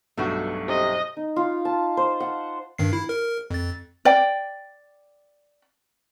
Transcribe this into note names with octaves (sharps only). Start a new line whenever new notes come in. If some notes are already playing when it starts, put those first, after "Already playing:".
B1 G2 B2 A3 F#4
C3 D#5
D#4
F4
A5
C5
F#5
G2 D#3 C7
E4
A#4
F2 A6
D5 G5